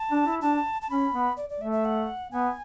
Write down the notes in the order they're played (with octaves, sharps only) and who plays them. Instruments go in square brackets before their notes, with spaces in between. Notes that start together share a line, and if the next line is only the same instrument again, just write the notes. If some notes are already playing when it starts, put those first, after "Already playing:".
Already playing: [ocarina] A5
[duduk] D4
E4
[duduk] D4 [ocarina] A5
[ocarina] A5
[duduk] C#4 [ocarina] B5
[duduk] B3
[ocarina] D5
D5
[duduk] A3 [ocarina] E5
[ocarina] E5
F#5
[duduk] B3 [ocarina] G#5